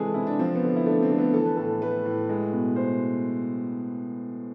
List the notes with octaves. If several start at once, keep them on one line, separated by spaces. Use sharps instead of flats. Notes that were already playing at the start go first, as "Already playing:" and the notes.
Already playing: C3 E3 G#3 G#4 A4 B4
C3 E4
D4
F3 C4
B3
D3
E4
A3 D4
C4
D3
B3
E3 A4
B4
A2 A4
A3 B4
A2
G#3
B2
B2 C5